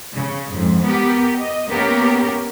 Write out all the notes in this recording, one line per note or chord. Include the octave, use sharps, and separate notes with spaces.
C#3
F2 G#2
B3 G4 A#4
D#5
A#3 B3 C#4 G4 A#4